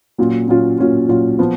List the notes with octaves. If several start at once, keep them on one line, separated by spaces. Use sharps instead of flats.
A#2 F#3 C#4 F4
A#2 F#3 C#4 F4
A#2 F#3 C#4 F4
A#2 F#3 C#4 F4
F3 B3 F4